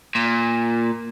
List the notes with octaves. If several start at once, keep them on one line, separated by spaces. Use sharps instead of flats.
A#2